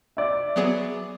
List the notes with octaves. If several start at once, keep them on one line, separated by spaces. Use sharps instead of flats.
D5 E5
F#3 B3 G#4